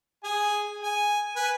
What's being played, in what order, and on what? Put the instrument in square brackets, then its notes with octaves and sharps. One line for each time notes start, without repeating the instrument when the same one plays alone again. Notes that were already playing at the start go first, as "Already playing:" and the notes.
[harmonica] G#4 G#5
G#5
B4 G#5